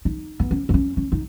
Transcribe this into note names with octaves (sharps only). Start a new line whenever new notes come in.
D#4
B3
C#4
B3
C#4
C#4
D#4